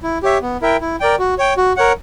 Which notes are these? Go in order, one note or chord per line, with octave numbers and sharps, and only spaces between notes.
E4
G4 C#5 E5
B3
E4 A#4 E5 G5
E4
A#4 D5 G5
F#4
C#5 G5
F#4
A#4 C#5 F#5